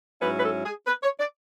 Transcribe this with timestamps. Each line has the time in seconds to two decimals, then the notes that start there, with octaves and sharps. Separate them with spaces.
0.20 G#2 F#3 C#4 E4 B4
0.38 B4
0.43 A4
0.64 G#4
0.87 B4
1.03 C#5
1.19 D5